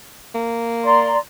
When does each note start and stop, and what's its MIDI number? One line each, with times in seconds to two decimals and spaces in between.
0.34 1.14 58
0.83 1.17 74
0.83 1.17 82
0.83 1.17 84